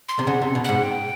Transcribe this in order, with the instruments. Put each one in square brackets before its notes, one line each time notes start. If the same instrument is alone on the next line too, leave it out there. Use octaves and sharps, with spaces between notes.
[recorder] C6
[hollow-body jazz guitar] C3
[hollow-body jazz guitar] C#3 [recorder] F#5
[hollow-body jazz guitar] C3
B2
[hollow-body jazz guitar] G#2 [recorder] F#5
[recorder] G5